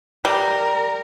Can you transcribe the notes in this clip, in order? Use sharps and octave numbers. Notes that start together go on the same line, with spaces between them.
G3 A#4